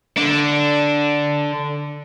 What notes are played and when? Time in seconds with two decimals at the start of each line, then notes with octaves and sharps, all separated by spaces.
0.17 D3 D4